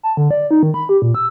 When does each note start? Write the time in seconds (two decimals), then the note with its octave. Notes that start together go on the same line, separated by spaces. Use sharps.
0.03 A5
0.17 D3
0.31 D5
0.51 D#4
0.63 D#3
0.74 B5
0.89 G4
1.02 A#2
1.15 E6